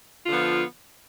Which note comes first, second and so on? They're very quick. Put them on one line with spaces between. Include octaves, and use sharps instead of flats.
F4 D3 F3 B3